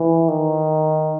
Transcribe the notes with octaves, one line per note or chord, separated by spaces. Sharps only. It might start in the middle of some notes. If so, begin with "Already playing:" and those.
Already playing: E3
D#3